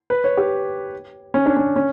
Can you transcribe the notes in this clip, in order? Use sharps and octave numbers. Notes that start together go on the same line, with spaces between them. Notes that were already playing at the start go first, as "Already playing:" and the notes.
B4
C#5
G4
C#4
D4
C#4
C#4